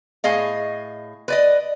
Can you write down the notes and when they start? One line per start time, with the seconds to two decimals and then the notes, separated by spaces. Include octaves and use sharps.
0.24 A2 G#4 D#5 F5
1.28 B4 D5 D#5